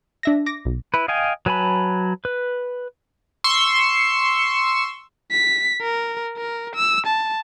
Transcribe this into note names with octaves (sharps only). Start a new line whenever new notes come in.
D4 E5 A#6
D6 A#6
B1
E4 B4
D#5 F5 G5 G#5
F#3 B4 G#5 A5 B5
B4
C6 C#6 E6
B6
A#4
A#4
E6
A5